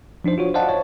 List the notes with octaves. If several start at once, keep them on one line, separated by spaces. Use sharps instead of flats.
F3 D4 D#4 C5
F4 F#4 C#5
C5 D5 D#5 F5 F#5 A5
C#5 A5